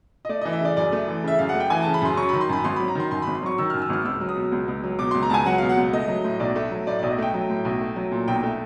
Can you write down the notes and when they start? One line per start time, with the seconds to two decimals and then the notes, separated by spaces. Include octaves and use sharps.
0.25 D#5
0.29 A3 D5
0.41 E3 D#5
0.53 E5
0.61 C#3 D5
0.77 F#2 D5
0.92 A3
1.08 E3
1.24 C#3 E5
1.39 F#2 F5
1.49 F#5
1.54 A3
1.60 G5
1.70 E3 G#5
1.82 C#3 A5
1.94 B5
2.02 F#2 C6
2.17 F#3 C#6
2.29 D#3 B5
2.41 C6
2.49 F#2 B5
2.64 G#1 C6
2.76 F#3 B5
2.88 A#5
2.95 D#3 C6
3.11 F#2 C6
3.22 G#1 B5
3.35 C6
3.43 F#3 C#6
3.58 D#3 E6
3.70 F#2 F6
3.82 E6
3.90 G#1 F6
4.05 C#2 E6
4.21 F#3
4.29 D#6
4.37 B2
4.52 C#2
4.68 C#2
4.84 F#3
4.99 B2 D6
5.11 C#2 C6
5.23 A#5
5.30 C#2 G#5 A5
5.46 F#3 F#5
5.58 B2 F5
5.69 F#5
5.77 C#2
5.93 A3 D#5
6.08 F#3
6.24 A2
6.40 B1 D5
6.56 A3
6.71 F#3
6.87 A2 D5
6.99 B1 D5
7.10 D#5
7.18 A3 G5
7.34 F#3
7.50 A2
7.65 B1
7.81 A3
7.96 F#3
8.11 A#2
8.28 B1 G5
8.43 A3